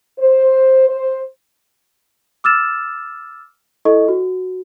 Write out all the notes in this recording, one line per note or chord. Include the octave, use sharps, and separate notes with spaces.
C5
C5
D6 E6 F6 A6 E7
E4 A4 D#5 C#6
F#4